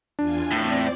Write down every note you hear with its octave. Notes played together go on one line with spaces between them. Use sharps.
E2 D4 F4 G#5
A2 C4 D5